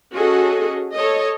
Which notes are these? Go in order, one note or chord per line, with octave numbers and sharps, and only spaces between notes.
C#4 F#4 G#4 A4 D#5
A4 C#5 D#5